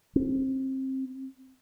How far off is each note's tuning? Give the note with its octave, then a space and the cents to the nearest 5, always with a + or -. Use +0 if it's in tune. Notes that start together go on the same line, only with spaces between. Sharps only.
C4 +25